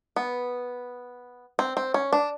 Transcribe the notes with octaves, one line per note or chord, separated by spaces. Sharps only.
B3
C4
C4
C#4
D4